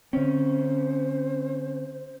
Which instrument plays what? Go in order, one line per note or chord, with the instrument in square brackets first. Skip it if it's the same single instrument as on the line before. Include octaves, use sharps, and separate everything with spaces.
[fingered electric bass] D3 C4 [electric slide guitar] C#4 [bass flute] C5